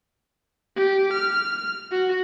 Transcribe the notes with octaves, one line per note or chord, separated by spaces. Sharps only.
G4
F6
F#4